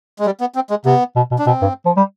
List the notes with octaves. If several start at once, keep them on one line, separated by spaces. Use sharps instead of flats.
G#3
G3
B3
C4
G#3
C3 B3
B2
B2
D4
B2 C4
G2
F3
G3